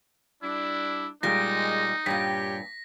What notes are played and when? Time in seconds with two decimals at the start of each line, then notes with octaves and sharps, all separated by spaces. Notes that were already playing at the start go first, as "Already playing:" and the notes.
0.43 G3 D4 E4
1.23 A#2 G3 G#3 D#4 A#6
2.06 G2 A#2 G4 C#5 G5 B6